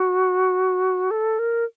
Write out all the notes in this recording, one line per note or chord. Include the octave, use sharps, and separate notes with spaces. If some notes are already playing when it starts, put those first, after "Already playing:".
Already playing: F#4
A4
A#4